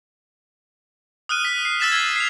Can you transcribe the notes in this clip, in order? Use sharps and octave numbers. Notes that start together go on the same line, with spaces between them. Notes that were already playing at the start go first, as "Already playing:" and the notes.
D#6 F6 F#6 D#7
B6
C7
E6 F6 A6 B6 E7
E6 G#6
C7 F7